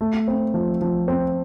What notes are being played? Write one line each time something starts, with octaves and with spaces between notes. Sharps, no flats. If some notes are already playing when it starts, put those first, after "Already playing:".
A3
C4
F3
F3
C4